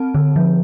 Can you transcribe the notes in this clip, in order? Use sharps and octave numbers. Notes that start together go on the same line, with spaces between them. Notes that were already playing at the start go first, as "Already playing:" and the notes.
Already playing: C4 A5
D3
F3